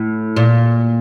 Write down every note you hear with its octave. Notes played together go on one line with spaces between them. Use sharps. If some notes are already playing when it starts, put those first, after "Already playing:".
Already playing: A2
A#2